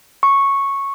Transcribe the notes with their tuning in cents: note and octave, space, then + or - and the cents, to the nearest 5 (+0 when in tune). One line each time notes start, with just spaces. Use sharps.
C#6 -10